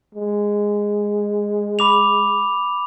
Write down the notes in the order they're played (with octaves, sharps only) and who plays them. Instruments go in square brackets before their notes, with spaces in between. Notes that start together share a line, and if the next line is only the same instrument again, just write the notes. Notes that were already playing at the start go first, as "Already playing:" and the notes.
[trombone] G#3
[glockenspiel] B5 D6 F7